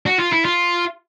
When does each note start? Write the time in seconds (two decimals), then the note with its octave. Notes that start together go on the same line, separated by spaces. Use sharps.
0.06 F#4
0.19 F4
0.33 E4
0.45 F4